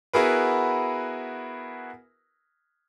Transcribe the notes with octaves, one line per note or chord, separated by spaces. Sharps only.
B3 E4 F#4 G#4 A#4 B4